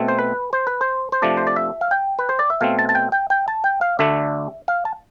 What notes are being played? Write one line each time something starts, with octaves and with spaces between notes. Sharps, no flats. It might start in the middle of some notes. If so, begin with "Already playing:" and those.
Already playing: B2 A3 C4
C5
B4
C5
B4
C5
C5
C3 F3 A3 D4 D5
C5
D5
E5
F5
G5
B4
C5
D5
E5
B2 A3 C4 F5
A5
A5
G5
G5
G5
A5
G5
F5
D2 D3 A3 D4 E5
F5
A5